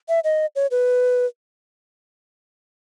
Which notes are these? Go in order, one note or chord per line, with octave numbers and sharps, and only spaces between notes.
E5
D#5
C#5
B4